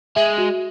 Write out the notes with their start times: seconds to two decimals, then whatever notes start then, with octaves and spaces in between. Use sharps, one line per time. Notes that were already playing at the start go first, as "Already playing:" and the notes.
0.16 G#3 E5
0.38 F#4